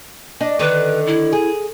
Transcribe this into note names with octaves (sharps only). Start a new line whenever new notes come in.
D4 D#5
D3 D#3 B4
E4
G#4